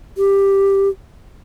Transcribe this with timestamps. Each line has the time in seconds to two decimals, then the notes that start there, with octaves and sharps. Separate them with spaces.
0.18 G4